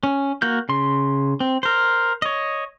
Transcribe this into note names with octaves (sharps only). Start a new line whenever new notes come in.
C#4
A#3 F#4 G6
C#3 C6
C4
A#4 C5
C#5 D#5